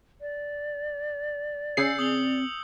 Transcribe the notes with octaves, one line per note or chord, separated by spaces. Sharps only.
D5
C#3 G#4 E6 G6 C7 C#7
C4 D#6 F#7 G7